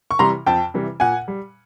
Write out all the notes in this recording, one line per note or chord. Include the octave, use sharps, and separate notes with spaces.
C#6
C3 E3 G3 A#5 C6
F2 G5 A5
C3 E3 G3
A#2 F#5 G#5
G3